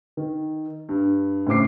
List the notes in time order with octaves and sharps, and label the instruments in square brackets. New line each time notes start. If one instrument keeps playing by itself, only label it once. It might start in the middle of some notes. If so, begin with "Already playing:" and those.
[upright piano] D#3
G2
A2 C#3 C5 D6 C7